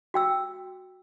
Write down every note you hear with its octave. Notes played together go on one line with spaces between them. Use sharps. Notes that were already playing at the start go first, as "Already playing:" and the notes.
F#4 G5 E6